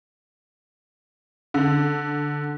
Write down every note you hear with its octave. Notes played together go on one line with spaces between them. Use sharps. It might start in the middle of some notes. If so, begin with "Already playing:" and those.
D3